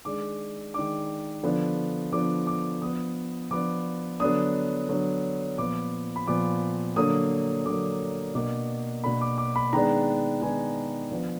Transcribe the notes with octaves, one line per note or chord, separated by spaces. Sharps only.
D#3 G#3 D4 D6
D#3 G#3 D4 D6
D3 F3 B3 D4
D3 F3 B3 D4 D6
D6
F3 B3 D4 D#6
F3 B3 D4 D6
D3 F#3 B3 D4 D#6
D3 F#3 B3 D4
A#2 F3 B3 D6
B5
A#2 F3 B3 D6
D3 F#3 A#3 D#6
D3 F#3 A#3 D6
B2 A#3 D4 D6
B2 A#3 D4 B5
D6
D6
B5
D#3 G#3 B3 D4 A#5
D#3 G#3 B3 D4 G#5
F3 B3 D4 B4